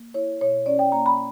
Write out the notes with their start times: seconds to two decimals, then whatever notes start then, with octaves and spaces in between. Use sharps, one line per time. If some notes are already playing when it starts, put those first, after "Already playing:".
Already playing: A#3
0.14 E4 C#5
0.41 B2 C#5
0.66 C#4 D5
0.79 G5
0.92 A#3 A#5
1.06 B5